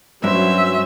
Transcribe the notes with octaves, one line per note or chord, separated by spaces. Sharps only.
G2 F#3 C#4 C5 E5